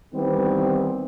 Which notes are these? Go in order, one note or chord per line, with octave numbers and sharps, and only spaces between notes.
D#3 E3 G3 B3 C4